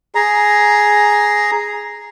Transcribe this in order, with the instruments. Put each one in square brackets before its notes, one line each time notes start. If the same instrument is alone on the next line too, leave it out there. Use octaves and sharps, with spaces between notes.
[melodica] G#4 A#5